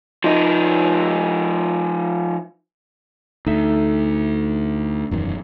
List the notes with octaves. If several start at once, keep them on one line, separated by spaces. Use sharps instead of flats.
F3 D#4
D2 D#4 A4 E5
E1 F#2 D#3